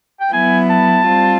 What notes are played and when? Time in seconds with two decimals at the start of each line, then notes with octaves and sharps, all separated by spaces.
0.21 G5
0.32 F#3 B3 E4 G#5
0.70 A5
1.06 G3 C4 F4